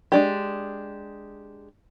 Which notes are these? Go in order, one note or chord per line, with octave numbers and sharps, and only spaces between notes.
G#3 D4 G4